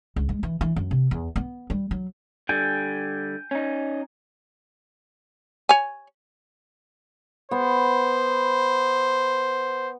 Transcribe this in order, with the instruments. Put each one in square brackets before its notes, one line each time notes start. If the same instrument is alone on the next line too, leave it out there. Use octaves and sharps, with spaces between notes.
[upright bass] C#2
G#3
E3
E3
F#2
C3
E2
B3
G3
F#3
[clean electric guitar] D3 G3 [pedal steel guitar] G5 G#5
[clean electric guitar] C#4 D#4
[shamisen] C#5 G#5
[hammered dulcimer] B3 [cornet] C5